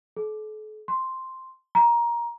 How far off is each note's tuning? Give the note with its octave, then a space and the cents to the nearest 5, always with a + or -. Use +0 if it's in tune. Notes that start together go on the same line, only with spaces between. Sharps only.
A4 -45
C6 +0
A#5 +20